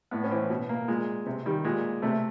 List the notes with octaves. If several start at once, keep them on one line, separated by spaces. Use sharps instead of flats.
A2 B3
C#4
E3 C4
B2
A#3
A#2 G#3
C3
D#3 G3
A#2 G#3
C3 A3